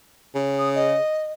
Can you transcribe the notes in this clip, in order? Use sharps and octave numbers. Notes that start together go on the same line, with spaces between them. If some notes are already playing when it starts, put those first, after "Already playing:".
C#3
D#6
D#5